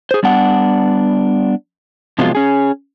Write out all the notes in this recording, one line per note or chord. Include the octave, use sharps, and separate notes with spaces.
G#4 C5
G3 B3 D4 F#5
C3 F3 F#3 G#3 B3 F4
C#4 G#4